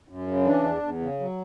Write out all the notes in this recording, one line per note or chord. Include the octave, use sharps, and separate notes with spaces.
F#2
C#3
E3 D4
E2
E2
C#3
F#3